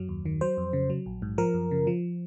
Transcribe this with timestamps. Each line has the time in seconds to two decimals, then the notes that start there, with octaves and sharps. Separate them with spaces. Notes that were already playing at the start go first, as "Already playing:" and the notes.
Already playing: F#2 F#3
0.09 D#2
0.26 D#3
0.41 F#3 C5
0.58 F2
0.73 C#3
0.90 F#3
1.06 A#1
1.22 G#2
1.38 F3 A#4
1.54 F#2
1.71 C#3
1.87 F3